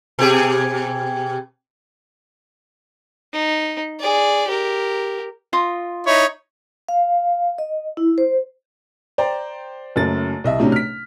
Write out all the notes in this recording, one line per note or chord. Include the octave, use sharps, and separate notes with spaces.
B2 G4 G#4
D#4
G#4 D5
G4 A#4
F4 D#5 D#6
D#4 E4 C#5
F5
D#5
E4
C5
C5 D5 G5 A#5
F#1 F#2 A3 A6
C2 D#5 E5
A2 C3 F#3 C#4 D4
F6 B6